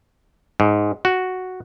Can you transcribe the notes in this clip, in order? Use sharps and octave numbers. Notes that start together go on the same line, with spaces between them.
G#2
F#4